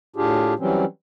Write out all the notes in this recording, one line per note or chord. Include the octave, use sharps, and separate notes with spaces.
A2 D4 F4 G4 G#4
E3 F#3 G3 C4 C#4